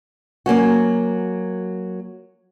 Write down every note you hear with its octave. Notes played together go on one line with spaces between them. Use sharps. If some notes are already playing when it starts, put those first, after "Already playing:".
F#3 A#3 C#4 F#4